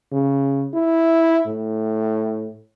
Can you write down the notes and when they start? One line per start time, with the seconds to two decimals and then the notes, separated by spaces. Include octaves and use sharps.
0.12 C#3
0.74 E4
1.47 A2